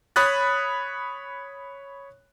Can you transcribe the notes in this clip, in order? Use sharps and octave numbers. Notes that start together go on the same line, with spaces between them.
C#5 B5 D#6 F#6 A6